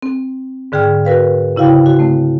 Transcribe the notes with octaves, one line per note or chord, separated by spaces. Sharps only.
C4
G#2 D3 G#4 G5 F6
F#4 A#4 B4 F5
C#3 E4 F#4 F5 G5
F#4
A3 C4